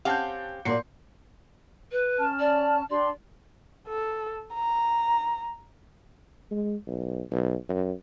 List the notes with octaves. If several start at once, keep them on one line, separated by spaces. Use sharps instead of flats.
C4 C#4 G4 F5 F#5 A5 G6
A#2 F#3 A#3 D5 C6 C7 C#7
B4
C#4 A5 F6
D5
D4 G4 D5 C6
A4
A#5
G#3
B1
B1
F#2